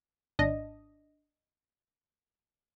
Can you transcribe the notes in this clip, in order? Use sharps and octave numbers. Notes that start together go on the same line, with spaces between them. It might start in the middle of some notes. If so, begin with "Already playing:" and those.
G#1 D4 D#5